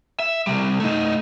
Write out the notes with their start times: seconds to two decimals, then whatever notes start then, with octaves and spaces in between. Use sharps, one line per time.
0.20 E5
0.47 C3 G3
0.80 A3 D#4